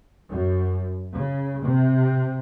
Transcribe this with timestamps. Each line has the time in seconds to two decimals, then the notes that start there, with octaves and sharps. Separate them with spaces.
0.30 F#2
1.13 C#3
1.64 C3